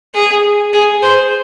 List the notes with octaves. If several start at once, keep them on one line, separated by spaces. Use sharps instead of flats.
G#4
G#4
C5